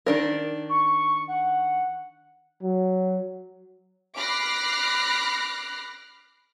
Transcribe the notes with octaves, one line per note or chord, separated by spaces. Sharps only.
D#3 D4 A#4
C#6
F#5
F#3
B5 D6 F6 F#6 A#6 C7